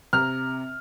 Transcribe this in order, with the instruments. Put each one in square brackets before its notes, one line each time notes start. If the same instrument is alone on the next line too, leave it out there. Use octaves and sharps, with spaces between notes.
[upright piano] C3 A#5 [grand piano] F6